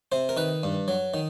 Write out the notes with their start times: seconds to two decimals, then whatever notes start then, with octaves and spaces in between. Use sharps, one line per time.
0.12 C3 C5
0.29 A#4
0.37 D#3 B4
0.63 G2
0.88 F#3
1.14 D#3